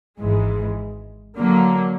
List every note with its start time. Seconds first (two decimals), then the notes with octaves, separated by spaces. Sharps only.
0.19 G#1 G#2 E3 G#3
1.36 D3 F#3 A#3